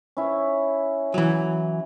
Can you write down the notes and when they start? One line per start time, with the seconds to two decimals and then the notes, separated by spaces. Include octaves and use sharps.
0.17 C#4 E4
1.14 E3 F#3